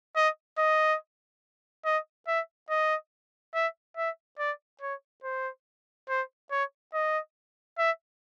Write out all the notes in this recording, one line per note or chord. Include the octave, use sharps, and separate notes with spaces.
D#5
D#5
D#5
E5
D#5
E5
E5
D5
C#5
C5
C5
C#5
D#5
E5